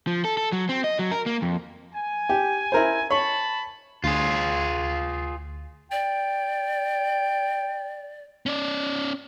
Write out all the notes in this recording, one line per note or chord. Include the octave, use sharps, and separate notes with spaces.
F3
A4
A4
F#3
C4
D#5
F#3
A#4
A#3
F2
G#5
G4
E4 A#4 C5
C#5 A5 B5
D2 F4 G#4
D5 G5
C#4 D5